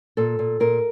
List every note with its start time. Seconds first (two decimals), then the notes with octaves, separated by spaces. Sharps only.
0.17 A#2 A4
0.39 A#2
0.60 A#2 A#4